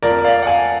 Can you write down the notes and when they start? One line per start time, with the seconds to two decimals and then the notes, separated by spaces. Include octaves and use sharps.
0.03 F2 F3 A#4 D5
0.24 D5 F5
0.42 F#5
0.47 F5 G#5